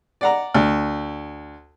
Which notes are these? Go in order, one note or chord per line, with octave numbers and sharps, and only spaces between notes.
D5 F#5 A#5
D2